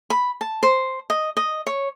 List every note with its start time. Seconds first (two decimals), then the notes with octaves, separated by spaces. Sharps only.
0.10 B5
0.41 A5
0.63 C5
1.10 D#5
1.37 D#5
1.67 C#5